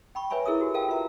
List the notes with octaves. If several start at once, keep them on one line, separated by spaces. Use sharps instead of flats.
G5 B5 C#6
B4 C#5 E5 G#5 B5 C#6
E4 G#4 A#4 E5 D#6
F#4 G4
A4 A#4 F5 G5 A5
F4 B4 E5 A#5